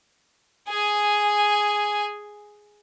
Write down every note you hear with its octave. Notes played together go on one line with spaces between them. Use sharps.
G#4 G#5